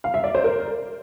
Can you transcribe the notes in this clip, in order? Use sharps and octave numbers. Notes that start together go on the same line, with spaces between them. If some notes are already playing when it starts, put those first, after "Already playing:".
F5
E5
D5
C5
A#4